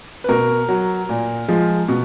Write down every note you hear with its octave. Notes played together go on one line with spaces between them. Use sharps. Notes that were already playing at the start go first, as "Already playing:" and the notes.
B4
B2 A#4
F#3
A#2
F3 G#3
B2